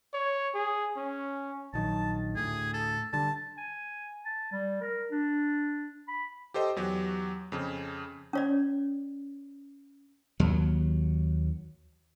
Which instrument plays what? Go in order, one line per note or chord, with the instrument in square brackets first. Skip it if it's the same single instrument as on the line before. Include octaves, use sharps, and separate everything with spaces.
[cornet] C#5
G#4
C#4
[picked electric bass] A#1 D#3 F#3 [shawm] A5
[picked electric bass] D2 A2 [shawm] G#4
[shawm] A4
[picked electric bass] D3 G3 [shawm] A5
[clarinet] G#5
A5
G3
A#4
D4
B5
[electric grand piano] G4 A4 C5 D#5 G5
E2 F#3 G4
F2 C#3
[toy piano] C#4 C#5 D5
[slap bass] D#2 F#3